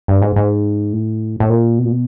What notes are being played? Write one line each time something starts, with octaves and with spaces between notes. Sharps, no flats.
G2
G#2
G#2
A2
A2
A#2
B2
A#2
B2